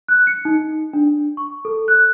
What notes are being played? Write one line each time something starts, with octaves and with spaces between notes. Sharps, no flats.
F#6
C#7
D#4
D4
C#6
A4
F#6